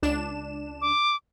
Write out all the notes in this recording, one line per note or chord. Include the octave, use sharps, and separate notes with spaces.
C#2 D4 E7
D6